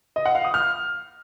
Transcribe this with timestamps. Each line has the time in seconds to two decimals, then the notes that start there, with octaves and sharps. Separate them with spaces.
0.16 D#5
0.26 F#5
0.35 F5
0.44 D#6
0.54 F6